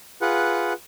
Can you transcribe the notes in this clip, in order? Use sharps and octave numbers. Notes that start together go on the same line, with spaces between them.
F4 G#4 B4 F#5